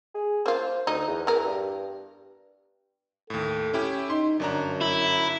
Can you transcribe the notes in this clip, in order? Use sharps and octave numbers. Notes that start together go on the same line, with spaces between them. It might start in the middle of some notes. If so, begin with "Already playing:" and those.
G#4
A#3 F4 C5
D2 D#4
E2
B3 A#4
G2
D#2 A2 A4
C#4 E4 G4
D#4 C6
G1 F#2 D4 A#5
E4